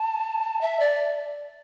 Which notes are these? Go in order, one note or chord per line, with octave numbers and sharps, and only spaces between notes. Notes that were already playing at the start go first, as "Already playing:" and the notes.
Already playing: A5
E5
D5